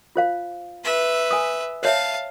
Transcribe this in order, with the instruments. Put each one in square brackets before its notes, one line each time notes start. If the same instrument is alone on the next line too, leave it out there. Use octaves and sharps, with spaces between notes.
[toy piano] F4 C5 F5
[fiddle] B4 E5
[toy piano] G#5 D#6
[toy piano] C5 C#5 E5 [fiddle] F5 A5